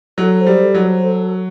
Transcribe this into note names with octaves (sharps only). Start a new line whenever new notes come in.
F#3 A4
C5
G3
A4
F#3
C5
A4
F#4